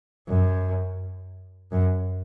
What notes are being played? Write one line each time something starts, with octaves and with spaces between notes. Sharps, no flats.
F#2
F#2